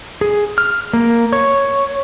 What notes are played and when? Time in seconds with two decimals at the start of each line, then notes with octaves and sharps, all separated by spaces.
0.21 G#4
0.58 F6
0.93 A#3
1.33 C#5